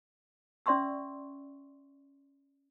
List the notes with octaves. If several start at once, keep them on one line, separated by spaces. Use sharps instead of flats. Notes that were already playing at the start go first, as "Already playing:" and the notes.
C#4 D5 E5 C6 C#6 E6